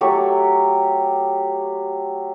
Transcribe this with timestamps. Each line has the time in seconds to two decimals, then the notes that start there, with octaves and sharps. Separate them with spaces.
0.01 F#3 A3 G4 C#6